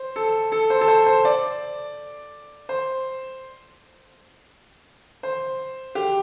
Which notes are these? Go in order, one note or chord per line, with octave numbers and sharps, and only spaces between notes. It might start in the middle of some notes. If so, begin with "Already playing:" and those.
Already playing: C5
A4
A4
C5
A4
C5
C5
D5
C5
C5
G4